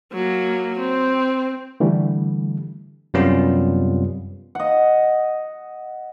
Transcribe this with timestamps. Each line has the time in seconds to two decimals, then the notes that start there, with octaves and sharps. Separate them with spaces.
0.13 F#3 A#3
0.80 C4
1.80 D3 E3 G3 A3
3.14 F#2 C3 G3 B3 C#4 F4
4.55 D#5 F#5